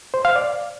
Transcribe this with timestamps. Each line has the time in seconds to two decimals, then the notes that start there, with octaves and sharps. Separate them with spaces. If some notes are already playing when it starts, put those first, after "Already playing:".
0.14 C5
0.25 F5
0.36 D5